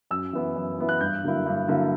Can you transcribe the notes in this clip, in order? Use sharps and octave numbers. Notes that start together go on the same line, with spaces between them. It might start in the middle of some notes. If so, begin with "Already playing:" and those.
F#2 E6
E3 B3 E4
F#2
E3 B3 E4
F#6
G2 G6
D3 F#3 A#3 E4
G2
D3 F#3 A#3 E4